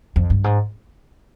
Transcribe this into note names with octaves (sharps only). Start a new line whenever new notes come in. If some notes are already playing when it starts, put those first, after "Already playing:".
F2
G2
G#2